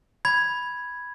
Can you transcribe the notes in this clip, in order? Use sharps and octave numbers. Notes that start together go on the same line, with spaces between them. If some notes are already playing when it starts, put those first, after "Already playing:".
B5 G#6